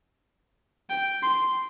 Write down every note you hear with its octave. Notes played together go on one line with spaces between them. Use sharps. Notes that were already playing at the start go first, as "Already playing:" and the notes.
G5
C6